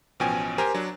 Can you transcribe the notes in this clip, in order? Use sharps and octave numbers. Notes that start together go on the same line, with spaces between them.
A1 B2 F3 C#4 G5 G#5
G4 A#4 C5 G5 G#5 A#5
F#3 D4